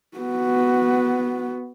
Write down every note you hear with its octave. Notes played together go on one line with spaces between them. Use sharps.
B3 F#4